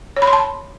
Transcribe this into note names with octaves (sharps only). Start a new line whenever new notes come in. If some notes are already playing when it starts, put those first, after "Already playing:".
C#5
B5
C6
A5